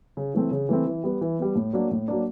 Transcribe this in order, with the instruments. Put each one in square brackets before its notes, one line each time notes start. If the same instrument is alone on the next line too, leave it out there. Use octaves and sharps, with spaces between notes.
[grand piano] C#3
E3 A3 C4
C#3
E3 A3 C4
E3
G3 B3
E3
G3 B3
A2
F#3 A#3 D4
A2
F#3 A#3 D4